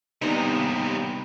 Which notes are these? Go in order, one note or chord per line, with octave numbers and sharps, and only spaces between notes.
D#2 C3 G3 B3 D#4 G#5